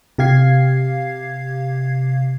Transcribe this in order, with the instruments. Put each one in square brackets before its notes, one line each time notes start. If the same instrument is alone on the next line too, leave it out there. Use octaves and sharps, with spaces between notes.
[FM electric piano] C3 G4 F5 G#6 C7